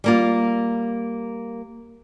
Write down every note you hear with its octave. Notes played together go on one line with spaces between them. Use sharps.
G3 A#3 F4